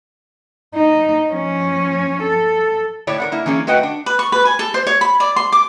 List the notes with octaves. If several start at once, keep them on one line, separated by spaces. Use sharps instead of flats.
D#4
F3 C#4
A4
A2 E4 C#5 D5
A#4 C5 F#5
A#3 E4
E3 A#3 C#4 G#4
A3 F#4 B4 D#5 F#5 G5
D4
B4
C#6
B4
G#5
A4
C5
C#5
B5
D5
C6
D6